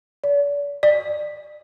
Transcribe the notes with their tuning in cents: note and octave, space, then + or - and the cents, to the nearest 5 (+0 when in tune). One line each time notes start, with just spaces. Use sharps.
D5 -45
D5 +30